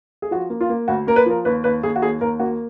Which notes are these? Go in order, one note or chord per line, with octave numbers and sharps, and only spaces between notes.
G#4
F3 F#4
A#3
F4
A#3
D2 F#4
A#3 A#4
B4
F3 A#4
D#2 B4
D#2 B4
D#2 G#4
F#4
D#2 G#4
D#2 A#4
A#3 F#4